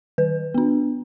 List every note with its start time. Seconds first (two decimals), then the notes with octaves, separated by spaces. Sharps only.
0.18 D#3 B4
0.54 B3 D4